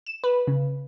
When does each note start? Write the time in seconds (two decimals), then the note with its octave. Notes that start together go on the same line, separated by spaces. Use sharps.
0.06 E7
0.24 B4
0.47 C#3